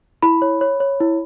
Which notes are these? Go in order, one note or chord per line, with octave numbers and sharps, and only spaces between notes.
E4 B5
C#5
C#5
C#5
E4